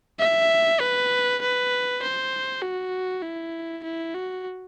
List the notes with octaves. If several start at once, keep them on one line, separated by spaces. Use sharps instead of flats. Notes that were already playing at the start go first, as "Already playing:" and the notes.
E5
B4
B4
C5
F#4
E4
E4
F#4